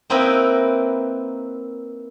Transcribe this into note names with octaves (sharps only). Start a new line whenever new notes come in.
A#3 C4 D#4 E4 A#4 B4